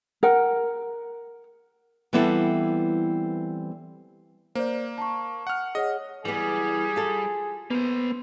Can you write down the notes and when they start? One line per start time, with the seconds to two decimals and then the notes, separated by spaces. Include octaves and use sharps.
0.23 A#4 F#5
2.13 E3 G3 B3 C4 E4 A4
4.55 A#3 C5 D5
4.98 A5 C#6
5.47 F#5 F6
5.75 G#4 C#5 D#5 F#5
6.25 E3 G3 B3 G#4
6.96 F4 A4
7.71 A#3 B3 C5